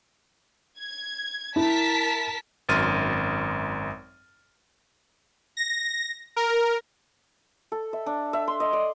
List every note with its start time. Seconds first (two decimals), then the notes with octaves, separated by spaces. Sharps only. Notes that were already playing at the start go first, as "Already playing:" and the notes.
0.78 G#6
1.56 E4 A#4 A5 B6
2.69 G#1 F#2 C6 F6 A6 D#7
5.57 A#6
6.36 A#4
7.72 A4
7.93 E5
8.06 D4
8.33 E5
8.48 C6
8.60 D#5
8.73 D5